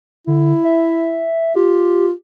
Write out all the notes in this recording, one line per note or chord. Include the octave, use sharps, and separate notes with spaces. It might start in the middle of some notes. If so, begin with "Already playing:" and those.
D3 E4
E5
F4 G4